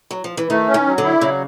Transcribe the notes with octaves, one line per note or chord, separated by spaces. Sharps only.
F#3
F3
E3
D#3 A3
C#4
D#3
F#3
D3
E4
C#3 F#3